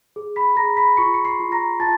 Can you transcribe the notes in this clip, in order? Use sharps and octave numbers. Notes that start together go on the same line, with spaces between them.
G#4
B5 B6
G#4 A#5 A#6
B5 B6
F4 C#6 C#7
C#7
C6 C7
F4
A#5 A#6
F4 A5 A6